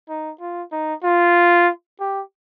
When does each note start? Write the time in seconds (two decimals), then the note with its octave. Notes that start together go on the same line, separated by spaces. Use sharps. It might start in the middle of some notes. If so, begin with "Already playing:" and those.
0.09 D#4
0.41 F4
0.72 D#4
1.04 F4
2.00 G4